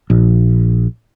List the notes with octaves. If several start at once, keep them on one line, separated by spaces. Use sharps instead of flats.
A#1